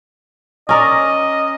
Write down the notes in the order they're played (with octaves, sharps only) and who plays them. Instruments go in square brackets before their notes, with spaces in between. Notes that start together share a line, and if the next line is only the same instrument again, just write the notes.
[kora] C#4 A#4 D5 [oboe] D#5